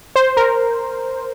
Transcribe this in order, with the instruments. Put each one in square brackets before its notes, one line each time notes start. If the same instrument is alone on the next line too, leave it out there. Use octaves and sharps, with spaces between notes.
[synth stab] C5
A#4